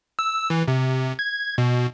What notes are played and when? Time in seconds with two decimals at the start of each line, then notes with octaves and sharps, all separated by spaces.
0.19 E6
0.50 E3
0.68 C3
1.19 G#6
1.58 B2